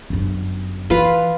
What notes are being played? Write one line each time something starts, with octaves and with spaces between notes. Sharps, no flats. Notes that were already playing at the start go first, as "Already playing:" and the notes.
G1 F#2
E3 F4 B4 F5